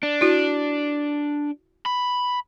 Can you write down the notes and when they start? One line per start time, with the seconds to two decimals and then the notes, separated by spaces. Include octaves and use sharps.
0.03 D4
0.21 E4 F#4
1.86 B5